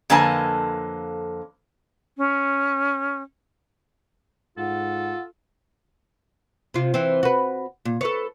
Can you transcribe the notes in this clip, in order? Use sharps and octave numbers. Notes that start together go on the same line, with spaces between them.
F2 D3 A#3 B4 G#5 A5
C#4
G#2 F4 A4 F#5
C3 F4
E3 C4
F#4 B4
A#2
A4 B4 C#5